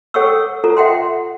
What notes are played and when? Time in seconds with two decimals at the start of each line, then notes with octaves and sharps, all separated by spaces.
0.14 A4 C#5 F#5 G5 C#6 E6
0.64 F4 A4 A#5
0.77 E5 F#5 G5 C6